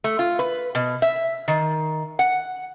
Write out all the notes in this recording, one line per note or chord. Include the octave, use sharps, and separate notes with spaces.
A3
F4
B4
B2
E5
D#3
F#5